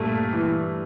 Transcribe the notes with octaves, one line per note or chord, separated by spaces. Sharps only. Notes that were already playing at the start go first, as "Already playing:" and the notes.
Already playing: G2 A#2 A3
E3